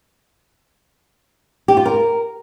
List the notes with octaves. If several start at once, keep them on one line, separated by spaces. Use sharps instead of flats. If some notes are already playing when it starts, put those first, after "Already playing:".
G4
F4
A#4